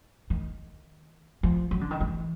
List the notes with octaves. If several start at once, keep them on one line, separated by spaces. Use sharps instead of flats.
D#3
F3
F#3
D3
D#3
E3